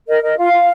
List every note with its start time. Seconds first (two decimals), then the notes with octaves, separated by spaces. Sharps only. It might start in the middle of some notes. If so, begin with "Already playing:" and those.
0.08 A#4 D#5
0.23 A#4 D#5
0.38 F4 F5
0.52 F4